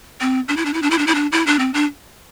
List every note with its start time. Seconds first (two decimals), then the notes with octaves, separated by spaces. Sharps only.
0.21 C4
0.48 D4
0.57 E4
0.65 D4
0.73 E4
0.82 D4
0.90 E4
0.98 D4
1.07 E4
1.15 D4
1.32 E4
1.46 D4
1.59 C4
1.74 D4